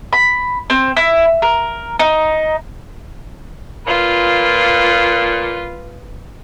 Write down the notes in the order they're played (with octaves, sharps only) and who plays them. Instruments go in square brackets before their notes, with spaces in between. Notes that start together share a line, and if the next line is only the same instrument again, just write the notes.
[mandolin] B5
C4
E4
A#4
D#4
[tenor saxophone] A#2 [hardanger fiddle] F4 B4